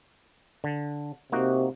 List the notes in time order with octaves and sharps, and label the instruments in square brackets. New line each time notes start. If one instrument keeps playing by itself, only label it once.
[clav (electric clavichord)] D3
[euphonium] C3 [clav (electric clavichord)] A#3 D#4 F#4